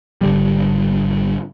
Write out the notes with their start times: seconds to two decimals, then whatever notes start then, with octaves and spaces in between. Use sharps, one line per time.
0.21 G#1 D3 G3